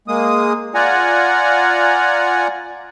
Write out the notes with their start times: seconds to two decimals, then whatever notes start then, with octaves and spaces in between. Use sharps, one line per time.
0.08 G#3 A#3 D#6
0.75 F4 D5 F#5 G#5 A#5